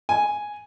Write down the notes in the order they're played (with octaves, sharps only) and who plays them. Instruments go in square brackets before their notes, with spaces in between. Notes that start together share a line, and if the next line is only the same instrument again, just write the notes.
[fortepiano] G#5